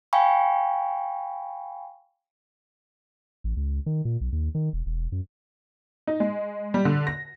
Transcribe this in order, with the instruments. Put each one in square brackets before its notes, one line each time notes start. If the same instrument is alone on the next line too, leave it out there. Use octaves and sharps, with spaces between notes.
[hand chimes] F5 G5 G#5 B5 C#6
[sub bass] A1
C#2
D#3
A#2
B1
D#2
D#3
E1
E1
F#2
[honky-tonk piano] D#4
G#3
G3
D3
A#6